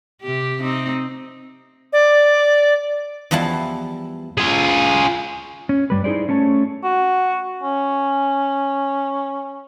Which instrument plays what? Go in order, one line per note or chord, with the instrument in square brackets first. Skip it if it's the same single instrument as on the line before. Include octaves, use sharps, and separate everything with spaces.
[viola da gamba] C3 G4
C4 D#4
[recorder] D5
[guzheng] E2 F3 G3 E4 A5
[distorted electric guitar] F4 G#4
[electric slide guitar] C#4
G2 G3 B4
D#4 E4 G#4 C5 D5
A3 C#4 C#5 A5
[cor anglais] F#4
C#4